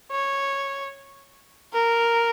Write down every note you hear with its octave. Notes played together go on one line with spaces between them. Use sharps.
C#5
A#4